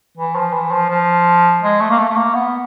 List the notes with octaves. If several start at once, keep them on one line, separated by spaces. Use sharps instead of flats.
E3
F3
E3
F3
F3
G#3
A3
A#3
A3
A3
A#3
B3